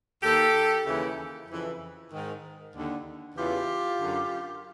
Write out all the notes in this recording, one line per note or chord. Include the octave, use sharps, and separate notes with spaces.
D#2 D#3 G4 A4
D#2 C#3 E3
F2 C#3 E3
G#2 D#3
D#2 D3
E2 C#3 E3 F4 G4
F#2 D3